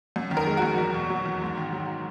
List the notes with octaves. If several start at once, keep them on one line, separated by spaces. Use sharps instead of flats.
F#2
D#3
A#4
G#3
F#2 F#4
E2
B2
F#3
E2
G#2
D#3
F#3